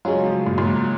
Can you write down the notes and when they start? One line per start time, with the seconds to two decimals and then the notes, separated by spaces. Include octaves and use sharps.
0.05 C#3 F#3 G#3 C#4 F4
0.26 F3
0.46 A#2
0.58 A#2
0.66 G#2